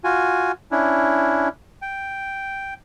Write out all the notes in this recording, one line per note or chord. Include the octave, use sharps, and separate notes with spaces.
F4 F#4 G#5
C#4 D4 E4
G5